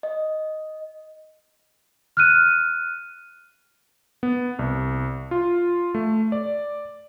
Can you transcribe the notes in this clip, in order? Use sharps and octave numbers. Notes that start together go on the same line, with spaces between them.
D#5
F6 F#6 D#7
B3
C2
F4
A3
D5